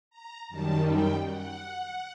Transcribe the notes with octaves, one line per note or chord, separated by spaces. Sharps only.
A#5
F#2 D#3 G3 A5
G5
F#5